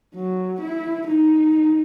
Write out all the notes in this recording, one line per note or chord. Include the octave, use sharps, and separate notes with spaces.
F#3
E4
D#4